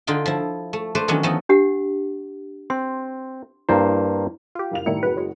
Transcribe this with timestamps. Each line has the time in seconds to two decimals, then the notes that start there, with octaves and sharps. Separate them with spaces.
0.07 D3 D#4 F4 G5
0.26 F3 E4
0.73 A3
0.95 A3 B4 C5 D5
1.08 D#3 E3 F#3 B3 C#4 D4
1.23 E3 F3 A3 B3 D#4
1.49 D4 G4 F#5
2.70 C4 C6
3.69 G2 A#3 E4 C5
4.55 F4 G4
4.71 F#1 F5 F7
4.86 A2 D#3 G3 E4 A#5 C#7
5.03 F#1 B3 F#4 G#4 B4
5.16 F#3 G#3